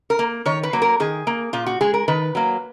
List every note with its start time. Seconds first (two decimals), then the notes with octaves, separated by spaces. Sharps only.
0.10 A#4
0.19 A#3
0.46 D#3 C#5
0.63 B4
0.73 F#3 A#3
0.82 A#4
1.00 D#3 G#4
1.27 A#3
1.53 A#2 F4
1.66 F#4
1.81 G#3 G#4
1.94 A#4
2.08 D#3 B4
2.35 F#3 A#3